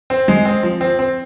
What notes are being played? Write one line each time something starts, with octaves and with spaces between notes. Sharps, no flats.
C4
G#3
C4
F3
C4
C4